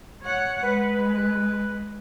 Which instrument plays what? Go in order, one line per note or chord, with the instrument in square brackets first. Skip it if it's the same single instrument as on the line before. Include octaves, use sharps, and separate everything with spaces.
[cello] C#5 F#5
[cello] G#3 [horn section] B4
[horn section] B4